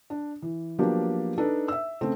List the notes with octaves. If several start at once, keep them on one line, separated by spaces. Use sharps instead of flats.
D4
E3
F3 F#3 A#3 B3 D4 G4
D4 D#4 A4 B4
E5 E6
C#3 A3 C4